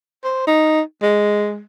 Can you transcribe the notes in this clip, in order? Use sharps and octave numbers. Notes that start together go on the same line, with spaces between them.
C5
D#4
G#3